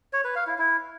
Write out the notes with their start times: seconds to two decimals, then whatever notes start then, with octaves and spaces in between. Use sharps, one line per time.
0.13 C#5
0.24 B4
0.36 F5
0.47 E4
0.58 E4